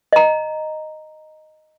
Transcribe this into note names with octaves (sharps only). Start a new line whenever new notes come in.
D#5 A#5